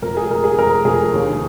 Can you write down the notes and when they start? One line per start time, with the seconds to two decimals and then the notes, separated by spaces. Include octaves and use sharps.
0.02 F2 A#4
0.17 G#4
0.30 F2 A#4
0.44 G#4
0.58 F2 A#4
0.85 F2 G#4
1.14 D#2